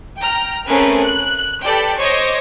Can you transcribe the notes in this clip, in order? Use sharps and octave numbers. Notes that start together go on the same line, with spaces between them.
G5 A#5 F6
A3 C4 C#4 G#4 A#4 B4
F#6
G4 A4 B4 D5 G5
C5 C#5 D#5 C#6 D6 A#6